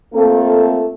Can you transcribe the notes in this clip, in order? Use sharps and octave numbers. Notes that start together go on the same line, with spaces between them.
A3 A#3 C4 F4 A4